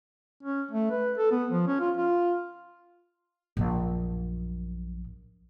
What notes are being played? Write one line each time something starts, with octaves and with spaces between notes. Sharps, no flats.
C#4
A3
B4
A4
B3
F3
C#4
F4
F4
A#1 F#2